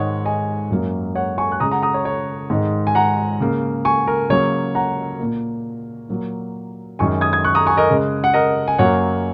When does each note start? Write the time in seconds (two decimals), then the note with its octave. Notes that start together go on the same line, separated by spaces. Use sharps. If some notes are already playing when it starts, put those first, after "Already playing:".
Already playing: G#2 D#3 G#3 C#5 F#5
0.25 D#5 G#5
0.71 F#2 F#3 A#3
1.15 C#5 F#5
1.38 G#5 C#6
1.52 F#6
1.60 C#3 G#3 A#5 D#6
1.71 F#5 A#5
1.83 A#5 D#6
1.94 C#5
2.05 C#5
2.50 G#2 D#3 G#3
2.87 G#5
2.95 F#5 A#5
3.40 C#3 A#3
3.85 G#5 C#6
4.07 A#4
4.30 C#3 F#3 A#3 C#5
4.75 F#5 A#5
5.19 A#2 A#3
6.09 A#2 F#3 A#3
6.99 F#2 D#3 G#3 G#5 C#6
7.21 D#6 G#6
7.33 D#6 G#6
7.44 C#6 F#6
7.55 A#5 D#6
7.67 G#5 C#6
7.77 A#4 D#5
7.89 C#3 G#3
8.24 F#5
8.34 A#4 D#5
8.68 G#5
8.78 F#2 F#3 A#3 C#5 F#5